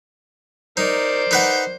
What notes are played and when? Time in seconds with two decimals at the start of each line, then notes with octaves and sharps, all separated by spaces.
0.77 D#4 A#4 C5 D5
1.31 D#4 B4 F#5